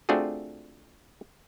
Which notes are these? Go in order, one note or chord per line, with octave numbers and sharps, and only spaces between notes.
A3 C4 D4 F4 F#4 G#4